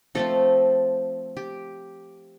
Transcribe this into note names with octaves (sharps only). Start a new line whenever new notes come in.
F3 A3 C4 A4
G4